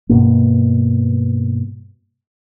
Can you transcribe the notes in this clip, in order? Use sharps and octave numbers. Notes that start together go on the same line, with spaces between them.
G2 B2 A#3